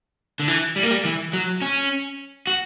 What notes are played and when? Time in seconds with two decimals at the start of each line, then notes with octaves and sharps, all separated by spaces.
0.40 D3
0.48 E3
0.76 G3
0.83 A#3
0.91 G3
1.05 E3
1.33 F#3
1.62 C#4
2.47 F#4